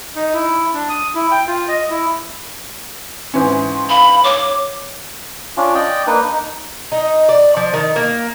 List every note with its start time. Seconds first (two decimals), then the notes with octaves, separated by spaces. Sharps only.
0.16 D#4
0.34 E4
0.74 D4
0.89 D#6
1.15 E4
1.31 G5
1.47 F4
1.68 D#5
1.90 E4
3.34 G#2 E3 C#4 C6
3.89 F5 B5
4.24 C#5 D6
5.57 C#4 D4 F4
5.75 D5 D#5 G5
6.07 A#3 D4 D#4 B4
6.28 D#4
6.92 D#4
7.29 D5
7.57 F3
7.74 D#3
7.96 A#3